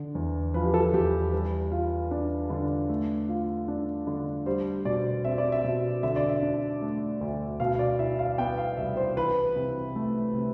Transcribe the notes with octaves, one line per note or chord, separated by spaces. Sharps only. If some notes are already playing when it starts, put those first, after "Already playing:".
Already playing: D3
E2
F3 B4
G4
A4
E2 G4
G3 B4
F4
D4
D3
A3
F4
D4
D3
G3 C5
B2 D5
C4 E5
D5
E5
B2
D3 E5
D5
E5
D4
A3
D2
B2 F5
D5
E4 E5
F5
B3 G5
F5
C2 E5
C5
E3 B4
C3
A3
C3